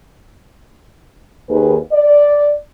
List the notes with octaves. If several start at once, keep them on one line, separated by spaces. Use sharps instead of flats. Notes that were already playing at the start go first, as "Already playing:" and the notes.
D#2 D#3 G#4 B4
D5